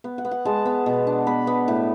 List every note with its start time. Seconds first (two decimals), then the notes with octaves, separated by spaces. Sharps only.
0.04 B3
0.18 F#5
0.25 B3
0.31 F#5
0.45 G#3 A5
0.66 B3
0.86 B2
1.07 D4
1.27 B3 B5
1.47 B3
1.68 A2